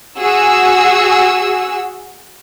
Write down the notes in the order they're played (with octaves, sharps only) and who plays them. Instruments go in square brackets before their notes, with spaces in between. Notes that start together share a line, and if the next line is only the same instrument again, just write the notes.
[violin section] F#4 G#4 E6